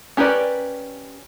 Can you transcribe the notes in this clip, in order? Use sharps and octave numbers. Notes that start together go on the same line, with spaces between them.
C#4 G4 A#4 B4 D5